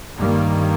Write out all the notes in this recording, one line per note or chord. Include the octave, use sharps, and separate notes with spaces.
G2 D#3 G3 A#3